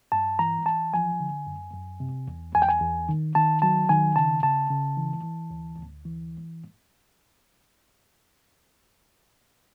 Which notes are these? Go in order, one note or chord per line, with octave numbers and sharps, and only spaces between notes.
G2 A5
E3 A#5
E3 A5
F3 G#5
D3
F#2
F#2
C3
E2
E2 G#5
G5
G#5
E2
D#3
D#3 A5
F#3 A5
D#3 G#5
C#3 A5
C#3 A5
C#3
E3
E3
D2
D2
E3